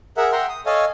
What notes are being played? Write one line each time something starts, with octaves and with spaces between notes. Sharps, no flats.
G#4 A#4 E5 F#5
E5 F#5 G5 A#5 C6
D#6
A4 C#5 D#5 F5 G#5